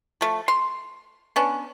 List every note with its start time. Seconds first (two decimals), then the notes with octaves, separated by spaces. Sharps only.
0.21 F3 A3
0.48 C6
1.36 B3 C#4 D4